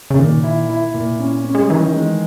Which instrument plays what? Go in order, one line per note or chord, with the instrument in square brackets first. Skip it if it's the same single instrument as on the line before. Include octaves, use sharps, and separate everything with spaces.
[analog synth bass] C#3
[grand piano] A#2 [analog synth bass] D#3
[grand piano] E4
E4
A#2
C#4
C#4
[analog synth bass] G#3
G3
[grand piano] D#3 [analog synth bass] E3
[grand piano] G#3